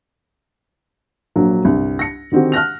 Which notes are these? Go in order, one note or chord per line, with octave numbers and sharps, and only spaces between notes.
A#1 F#3 A#3
G1 C2
A#6 C#7
D3 D#3 C4 F#4 G4
F6 F#6 A#6 F7